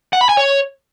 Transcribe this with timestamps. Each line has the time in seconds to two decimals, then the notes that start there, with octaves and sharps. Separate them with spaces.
0.13 F#5
0.21 B5
0.29 G#5
0.37 C#5